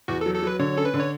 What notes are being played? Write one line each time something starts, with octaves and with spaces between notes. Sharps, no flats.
E2 F#4
A4
F#3
A4
F#3 B4
D3 C#5
C#4 A4
B4
D3
C#5